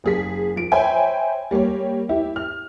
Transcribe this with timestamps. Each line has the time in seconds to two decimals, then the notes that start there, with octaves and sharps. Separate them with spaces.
0.04 F#1 G#4 B6
0.56 F3 D7
0.72 C5 C#5 E5 G5 G#5 B5
1.51 G3 A#3 G4 C#5
2.09 E4 G4
2.36 F6